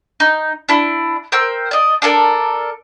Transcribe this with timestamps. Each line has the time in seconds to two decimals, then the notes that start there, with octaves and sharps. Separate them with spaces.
0.20 D#4
0.69 D4 E4
1.32 A#4 C5 G5 E6
1.71 D5 D#5
2.02 D4 A4 A#4 D5